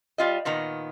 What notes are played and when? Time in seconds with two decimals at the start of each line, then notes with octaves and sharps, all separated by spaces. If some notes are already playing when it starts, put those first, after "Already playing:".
0.18 G3 F4 D#5
0.45 A#2 D#3 B3 A#5